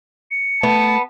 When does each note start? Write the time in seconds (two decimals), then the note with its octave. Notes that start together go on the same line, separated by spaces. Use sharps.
0.31 C#7
0.63 A3 B3 A5